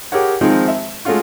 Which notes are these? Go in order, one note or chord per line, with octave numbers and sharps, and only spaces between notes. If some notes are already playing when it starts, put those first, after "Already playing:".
G4 G#4 A#4 C#5 F#5
D#3 F3 G#3 C4 D#4
E5
G#3 A3 C#4 F4 F#4